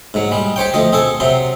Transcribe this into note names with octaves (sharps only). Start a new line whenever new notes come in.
G#2 F#3
G3 G#3
G4 C5 C#5 G5
D2 F3 D#5
C4 G#4 A4 A5
C3 F#3 C4 C6